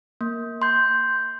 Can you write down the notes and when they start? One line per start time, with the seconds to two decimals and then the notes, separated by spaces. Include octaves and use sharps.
0.21 A#3
0.62 C6 G6